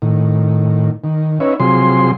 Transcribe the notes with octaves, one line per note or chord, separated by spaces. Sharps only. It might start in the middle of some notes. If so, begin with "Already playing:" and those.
A2 D#3
D#3
C#4 D#4 B4 C#5 E5
C3 F3 F#3 G#4 C6